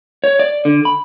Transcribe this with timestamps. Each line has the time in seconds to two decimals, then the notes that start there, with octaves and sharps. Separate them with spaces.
0.24 C#5
0.39 D5
0.65 D3
0.85 B5